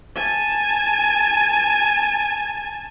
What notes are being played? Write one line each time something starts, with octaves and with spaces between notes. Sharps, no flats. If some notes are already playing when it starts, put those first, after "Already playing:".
G#5 A5